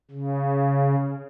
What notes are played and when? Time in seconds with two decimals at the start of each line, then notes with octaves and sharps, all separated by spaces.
0.11 C#3